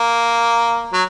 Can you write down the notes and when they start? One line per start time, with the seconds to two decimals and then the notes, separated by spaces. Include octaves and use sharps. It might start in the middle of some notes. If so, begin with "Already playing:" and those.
Already playing: A#3
0.93 F#3